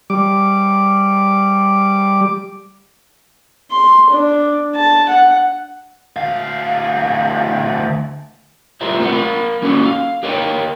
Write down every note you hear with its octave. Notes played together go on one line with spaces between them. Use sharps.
G3 D6
C6
D4
A5
F#5
D2 F5
F4 G4 A#4 C5 E5
A3 B3 C4 F4 A#4 F#5
A#4 F5 B5
A#3 C#4 D#4 F#4 G#4 A4
F5
G4 A#4 C#5 D#5 F5 G5